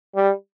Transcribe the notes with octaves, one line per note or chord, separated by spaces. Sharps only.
G3